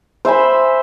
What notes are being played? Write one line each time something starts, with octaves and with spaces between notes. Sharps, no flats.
C5 E5 G#5 B5